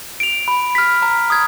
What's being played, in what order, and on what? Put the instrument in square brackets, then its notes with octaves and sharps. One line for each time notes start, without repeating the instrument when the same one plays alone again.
[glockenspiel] D7 F7
B5
F6 B6
A#5
D#6 G#6